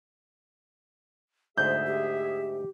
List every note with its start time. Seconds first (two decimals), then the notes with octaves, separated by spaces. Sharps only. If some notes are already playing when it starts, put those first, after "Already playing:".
1.57 D2 G#2 G#4 C5 E5 G6
1.86 G4